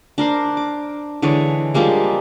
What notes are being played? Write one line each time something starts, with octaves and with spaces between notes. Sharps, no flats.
D4 A#4 C5
D6
D3 E3 G#3 C#5
F3 G3 G#3 A#3